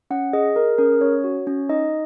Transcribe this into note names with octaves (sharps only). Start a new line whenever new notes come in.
C#4 F#5
G#4 D#5
G#4 A#4
C#4 A#4
C#4 C#5
F#4
C#4
D#4 D#5